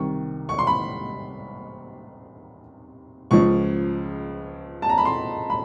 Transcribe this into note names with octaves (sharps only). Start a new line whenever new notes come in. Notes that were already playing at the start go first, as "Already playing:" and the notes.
Already playing: C2 C3 D#3 C#6
C#6
C6
B5
C#2 C#3 F3 C#6
A5
A#5
B5
C6
B5